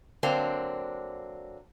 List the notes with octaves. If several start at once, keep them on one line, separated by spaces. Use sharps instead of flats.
D3 F#3 A#3 C4 D4